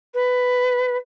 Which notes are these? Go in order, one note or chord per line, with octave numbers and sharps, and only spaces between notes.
B4